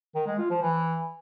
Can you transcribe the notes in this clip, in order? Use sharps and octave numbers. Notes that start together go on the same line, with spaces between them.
D#3
G#3
F4
F3
E3